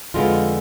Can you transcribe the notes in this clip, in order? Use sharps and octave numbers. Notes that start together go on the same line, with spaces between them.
F2 D3 G#3 B3 F4